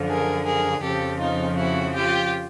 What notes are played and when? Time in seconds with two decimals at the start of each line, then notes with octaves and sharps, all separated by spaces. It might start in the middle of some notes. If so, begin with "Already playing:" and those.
Already playing: F#2 D3 F3
0.08 G#4 A#4
0.45 G#4 A#4
0.82 F2 C#3 F3 G4 A4
1.20 D#4 F4
1.57 E4 F#4
1.94 F4 G4